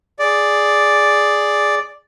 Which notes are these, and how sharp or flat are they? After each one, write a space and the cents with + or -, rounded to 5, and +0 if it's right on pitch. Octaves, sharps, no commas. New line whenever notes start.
G#4 +0 D5 +0